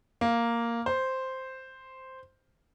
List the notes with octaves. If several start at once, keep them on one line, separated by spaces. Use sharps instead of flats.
A#3
C5